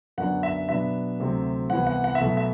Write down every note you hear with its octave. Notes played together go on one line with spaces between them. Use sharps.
F#2 D3 F#3 B3 D4 F#5
E5
B2 F#3 B3 D4 E5
D2 C3 F#3 C4
C2 C3 E3 B3 F#5
F#5
F#5
E5
B2 F#3 A3
E5